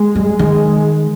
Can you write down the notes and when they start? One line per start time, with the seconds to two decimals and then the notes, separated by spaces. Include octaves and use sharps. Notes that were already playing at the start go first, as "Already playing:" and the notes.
Already playing: G#3
0.15 G3
0.39 D#3 G#3